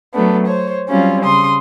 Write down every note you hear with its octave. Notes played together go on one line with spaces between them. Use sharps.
F#3 A3 B3 D4
C5 C#5
F#3 G3 C4 C#4 F4
C#3 C6 D#6